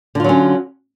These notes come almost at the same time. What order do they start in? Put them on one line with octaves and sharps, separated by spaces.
D3 F4 F#3 C#4